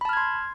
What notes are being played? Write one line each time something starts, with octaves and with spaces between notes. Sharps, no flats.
A5 B5 C6 F6 G#6